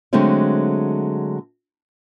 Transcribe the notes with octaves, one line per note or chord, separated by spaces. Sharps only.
D3 F#3 G#3 A3 C4 C#4